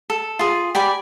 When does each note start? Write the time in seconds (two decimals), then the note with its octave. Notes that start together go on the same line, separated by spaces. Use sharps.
0.10 A4
0.39 F4 G#4
0.75 G4 D5 G#5 B5